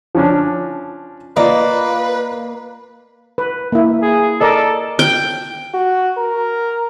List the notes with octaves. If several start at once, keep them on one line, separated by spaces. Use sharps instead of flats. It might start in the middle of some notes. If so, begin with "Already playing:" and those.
F3 C#4 D4
A#3 F4 B4 D5 D#5
B4
A#3 E4
G#4
A4 A#4 D5 D#5
G5
F#4
A#4